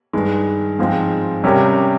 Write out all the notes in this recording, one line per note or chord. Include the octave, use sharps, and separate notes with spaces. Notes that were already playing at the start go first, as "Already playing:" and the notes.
G2 D#3 G#3
G#2 F3 G#3 C4
C3 G3 C#4 G4 A#4